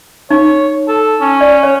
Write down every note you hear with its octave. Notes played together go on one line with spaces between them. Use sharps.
D#4 C#5
A4
C#4
D5
C#5